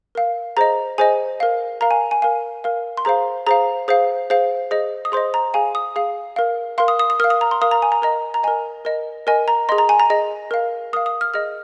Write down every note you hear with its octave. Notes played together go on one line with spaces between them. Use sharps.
A#4 F5
G#4 C5 D#5 A#5
G#4 C5 D#5 G#5
A#4 F5
A#4 F5 A#5
G#5
G#5
A#4 F5 G#5
A#4 F5
C6
G#4 C5 F5 A#5
G#4 C5 F5 A#5
G#4 C5 F5
G#4 C5 F5
G#4 C5 D#5
D#6
G#4 C5 D#5 C6
A#5
G#4 F5 G#5
D#6
G#4 F5
A#4 F5
A#4 F5 C6
D#6
D#6
D#6
A#4 F5 F6
D#6
A#5
C6
A#4 F5 D#6
A#5
G#5
A#5
A#4 D#5 A#5
A#5
A#4 D#5 G#5
A#4 D#5
A#4 D#5 G#5
A#5
G#4 D#5 C6
A#5
G#5
A#5
G#4 D#5
A#4 F5
A#4 F5 D#6
D#6
F6
G#4 D#5 F6